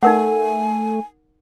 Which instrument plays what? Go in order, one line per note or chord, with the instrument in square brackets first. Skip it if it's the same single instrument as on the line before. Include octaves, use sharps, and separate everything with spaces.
[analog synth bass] A3 [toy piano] D#4 A#4 F#5 [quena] G#5